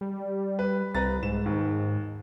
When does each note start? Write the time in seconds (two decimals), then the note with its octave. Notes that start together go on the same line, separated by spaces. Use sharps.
0.01 G3
0.59 B4
0.95 C2 B4 A#5 A6
1.23 G#2 E7
1.46 D#2